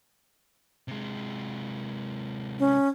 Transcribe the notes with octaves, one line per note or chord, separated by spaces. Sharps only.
C3 G#3
C#4